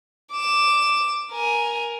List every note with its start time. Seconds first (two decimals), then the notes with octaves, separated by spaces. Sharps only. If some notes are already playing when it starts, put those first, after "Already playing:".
0.33 D6 E7
1.32 A#4 G#5